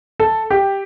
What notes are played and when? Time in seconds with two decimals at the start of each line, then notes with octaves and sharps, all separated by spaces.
0.20 A4
0.50 G4